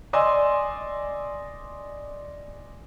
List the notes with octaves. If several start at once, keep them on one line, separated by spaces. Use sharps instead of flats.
D5 D#5 G#5 C6 E6